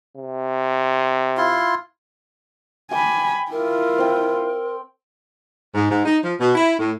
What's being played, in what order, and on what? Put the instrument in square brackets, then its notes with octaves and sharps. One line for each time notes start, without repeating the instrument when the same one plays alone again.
[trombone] C3
[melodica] E4 F4 C6
[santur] G5 D6 [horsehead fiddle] G#5 B5
[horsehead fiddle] E4 F4 [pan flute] A#4
[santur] C4 G5
[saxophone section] G#2
G#2
D#4
F3
B2
E4
A2